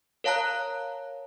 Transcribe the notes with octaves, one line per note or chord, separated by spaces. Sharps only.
A#4 C#5 F5 A5 A#5 F#6